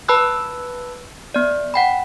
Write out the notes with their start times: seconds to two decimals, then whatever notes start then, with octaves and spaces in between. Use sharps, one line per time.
0.08 B4 A5 B5 E6 F#6
1.34 B3 D5
1.74 F#5 G5 B5